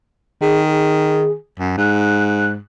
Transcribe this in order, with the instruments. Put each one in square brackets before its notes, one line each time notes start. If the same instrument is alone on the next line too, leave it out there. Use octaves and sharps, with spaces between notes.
[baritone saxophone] D#3 [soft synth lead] G#4
[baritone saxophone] F#2
[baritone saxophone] G#2 [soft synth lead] F#6